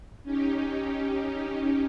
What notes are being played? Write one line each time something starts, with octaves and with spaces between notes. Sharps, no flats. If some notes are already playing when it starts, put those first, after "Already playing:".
C#4 D#4 G4